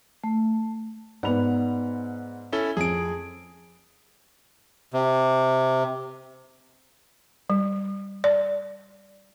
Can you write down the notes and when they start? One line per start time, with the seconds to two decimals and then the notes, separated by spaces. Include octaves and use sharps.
0.24 A3
1.23 G#2 B3 D5 F#5 B5 F7
2.53 C#4 E4 A4 G7
2.77 F2 G#4 D7
4.93 C3
7.50 G3
8.24 D5